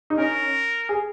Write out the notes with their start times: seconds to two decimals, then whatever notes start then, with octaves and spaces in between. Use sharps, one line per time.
0.10 D#4
0.18 C#4 A#4
0.89 G#4